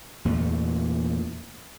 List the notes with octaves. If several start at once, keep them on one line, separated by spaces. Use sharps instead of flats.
E2 A#2 A3